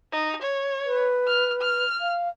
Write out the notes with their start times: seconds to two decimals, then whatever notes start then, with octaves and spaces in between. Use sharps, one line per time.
0.12 D#4
0.42 C#5
0.85 B4
1.27 F6
1.62 F6
2.01 F5